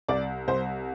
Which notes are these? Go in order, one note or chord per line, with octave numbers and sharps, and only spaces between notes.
C2 D5
C2 C5